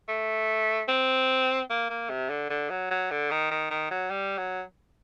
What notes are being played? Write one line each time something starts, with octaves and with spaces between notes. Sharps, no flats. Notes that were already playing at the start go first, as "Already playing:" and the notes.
A3
C4
A#3
A#3
C3
D3
D3
F#3
F#3
D3
D#3
D#3
D#3
F#3
G3
F#3